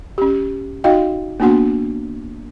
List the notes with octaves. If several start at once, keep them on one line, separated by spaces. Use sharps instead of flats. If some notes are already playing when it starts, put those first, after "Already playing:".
C#4 G4
D#4 F#4 D#5 F5 G5
A#3 B3 D4 F#4 F#5 C6